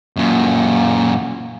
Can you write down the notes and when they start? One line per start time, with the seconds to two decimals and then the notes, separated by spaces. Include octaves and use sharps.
0.16 F#2 A#2